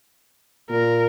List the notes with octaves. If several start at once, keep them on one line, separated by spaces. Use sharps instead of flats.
A#2 A#4